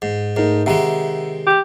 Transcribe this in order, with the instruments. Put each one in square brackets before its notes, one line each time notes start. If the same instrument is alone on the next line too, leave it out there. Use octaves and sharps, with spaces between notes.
[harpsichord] G#2
[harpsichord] G#2 [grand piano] A3 D#4 A#4
[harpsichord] C3 D#3 G#3 [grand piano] E5 F#5 A#5
[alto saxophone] G4